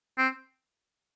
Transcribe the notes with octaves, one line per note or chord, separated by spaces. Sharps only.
C4